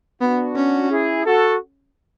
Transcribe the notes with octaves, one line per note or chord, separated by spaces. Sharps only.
B3 D4 F#4
C#4
E4 G#4
F#4 A4